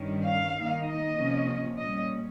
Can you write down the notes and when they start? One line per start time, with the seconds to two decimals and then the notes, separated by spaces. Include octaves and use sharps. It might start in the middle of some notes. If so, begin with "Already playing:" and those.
Already playing: G2 D#3 G3 C#4
0.24 F5
0.54 D#3 A#3 D#4
0.85 D#5
1.17 C3 F3 A#3 C#4
1.79 A#2 G3 C#4 D#5